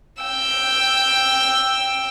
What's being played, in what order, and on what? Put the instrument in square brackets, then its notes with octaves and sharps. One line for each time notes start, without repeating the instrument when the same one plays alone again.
[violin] G5 E6